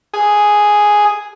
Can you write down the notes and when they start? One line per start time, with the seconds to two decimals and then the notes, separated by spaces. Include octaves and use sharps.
0.14 G#4